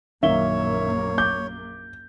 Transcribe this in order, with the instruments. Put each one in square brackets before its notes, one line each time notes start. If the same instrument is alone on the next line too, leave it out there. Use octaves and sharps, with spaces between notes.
[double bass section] A#1 F#2 A#3 [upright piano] D#3 F5 G7 [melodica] C#5 [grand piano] E5
[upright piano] D6 [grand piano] G6